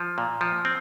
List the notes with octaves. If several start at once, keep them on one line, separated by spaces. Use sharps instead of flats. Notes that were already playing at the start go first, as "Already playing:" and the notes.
Already playing: F3
A#2
F3
C4